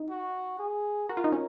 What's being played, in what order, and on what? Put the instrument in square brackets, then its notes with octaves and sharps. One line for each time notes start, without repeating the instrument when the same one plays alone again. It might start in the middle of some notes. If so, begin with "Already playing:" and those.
Already playing: [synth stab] D#4
[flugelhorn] F#4
G#4
[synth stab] F#4 [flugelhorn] A#4
[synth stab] F4
D#4
C#4